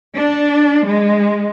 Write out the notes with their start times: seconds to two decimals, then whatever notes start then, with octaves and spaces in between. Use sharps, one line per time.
0.15 D4
0.87 G#3